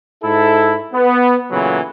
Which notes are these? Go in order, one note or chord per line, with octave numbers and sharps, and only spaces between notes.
G#2 E4 A4
B3
A#2 C#3 E3 F#3 A3 B3